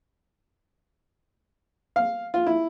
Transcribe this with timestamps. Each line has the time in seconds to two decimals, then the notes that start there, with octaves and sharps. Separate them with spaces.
1.96 F5
2.34 F4
2.47 E4